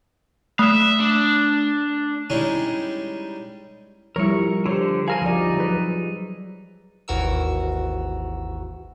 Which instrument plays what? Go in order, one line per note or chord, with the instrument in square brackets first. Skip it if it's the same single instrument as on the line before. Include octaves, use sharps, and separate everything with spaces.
[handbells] A3 [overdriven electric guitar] E5 F5
[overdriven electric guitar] D4
[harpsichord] G3 G#3 C#4 D#4 E4 G#4
[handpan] F3 G3 [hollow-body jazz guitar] E4 C#5 [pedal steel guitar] A#4 C#6
[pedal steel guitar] D3 C5 [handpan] G4 [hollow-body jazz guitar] C#5
[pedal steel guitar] G#4 A#4 G#5 [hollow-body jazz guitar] F5 A5 C6
[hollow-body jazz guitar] D2 [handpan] F3 D5 [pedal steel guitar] D#4
[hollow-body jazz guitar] F#3 G#4 B4
[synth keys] G#1 D#2 E3 F#4 A#4 E6